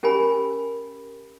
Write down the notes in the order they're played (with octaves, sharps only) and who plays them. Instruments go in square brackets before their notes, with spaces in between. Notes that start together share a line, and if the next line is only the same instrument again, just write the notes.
[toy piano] C#4 G4 A#4 G#5 B5